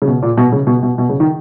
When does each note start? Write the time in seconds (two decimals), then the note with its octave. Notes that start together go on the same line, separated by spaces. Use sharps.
0.02 C#3
0.07 B2
0.22 A#2
0.37 B2
0.52 C#3
0.67 B2
0.83 B2
0.98 B2
1.09 C#3
1.20 D#3